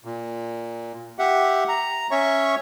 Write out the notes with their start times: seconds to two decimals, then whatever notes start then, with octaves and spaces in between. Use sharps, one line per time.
0.05 A#2
1.19 G4 E5 F#5
1.69 A#5
2.11 C#4 C#5 E5 C#6